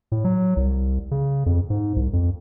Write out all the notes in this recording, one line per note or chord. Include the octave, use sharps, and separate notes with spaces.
A2
F#3
C2
C#3
F2
G#2
C2
F2